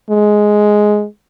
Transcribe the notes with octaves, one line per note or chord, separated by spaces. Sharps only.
G#3